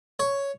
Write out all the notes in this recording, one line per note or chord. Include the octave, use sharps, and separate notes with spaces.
C#5